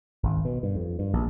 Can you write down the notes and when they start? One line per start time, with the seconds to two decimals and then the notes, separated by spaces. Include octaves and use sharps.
0.23 G#1
0.45 B2
0.63 G2
0.75 F2
0.99 G2
1.13 A#1